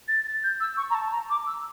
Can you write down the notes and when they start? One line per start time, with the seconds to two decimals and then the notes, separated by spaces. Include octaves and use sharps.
0.08 A6
0.26 A6
0.43 G6
0.60 E6
0.77 C#6
0.90 A#5
0.94 A5
1.12 A#5
1.30 D6
1.47 E6